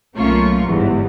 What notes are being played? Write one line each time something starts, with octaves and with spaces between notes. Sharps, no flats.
B1 A3 A#3 C#4 F4 C#6
G1 E2 G#2 E3